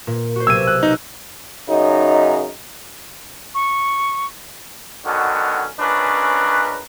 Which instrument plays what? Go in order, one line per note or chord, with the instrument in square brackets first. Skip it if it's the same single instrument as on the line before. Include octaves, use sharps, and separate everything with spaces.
[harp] A#2
F#4 C5
[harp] B1 C3 G#6 [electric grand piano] E6 D#7
[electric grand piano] F#6
D#4
[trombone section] F#2 C#3 D#4
[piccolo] C#6
[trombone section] B2 D3 D#3 F#3 C#4 F#4
C#2 C#4 D4 A#4 B4